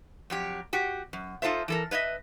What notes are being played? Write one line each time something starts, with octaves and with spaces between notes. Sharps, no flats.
F2 F#3 G4
F#4 G4
F#2
D#4 F4 A4 C5 E5
E3 A4 A#4
B4 C#5 D#5 E5